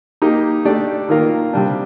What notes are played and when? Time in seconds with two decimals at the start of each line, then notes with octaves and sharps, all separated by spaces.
0.22 A#3 D#4 G4
0.65 A3 D4 G4 D5
1.08 D#3 A#3 F4 A#4
1.53 C3 G3 D4